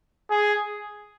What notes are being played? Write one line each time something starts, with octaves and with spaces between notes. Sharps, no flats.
G#4